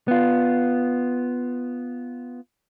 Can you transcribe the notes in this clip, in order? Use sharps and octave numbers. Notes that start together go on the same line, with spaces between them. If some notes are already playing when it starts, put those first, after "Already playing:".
B3 F4